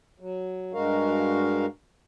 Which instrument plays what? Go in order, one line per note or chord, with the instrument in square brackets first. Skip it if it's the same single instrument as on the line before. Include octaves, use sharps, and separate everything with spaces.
[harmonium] F#3
G2 G#3 F#4 A#4 F5